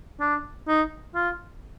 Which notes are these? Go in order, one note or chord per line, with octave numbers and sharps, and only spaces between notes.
D4
D#4
F4